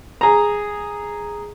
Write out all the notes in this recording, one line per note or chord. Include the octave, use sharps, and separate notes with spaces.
G#4 A#5